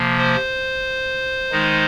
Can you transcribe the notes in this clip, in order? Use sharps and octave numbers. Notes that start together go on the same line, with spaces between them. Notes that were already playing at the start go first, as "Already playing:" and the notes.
Already playing: C3 F3 A#3
C5
D#3 G#3 D#4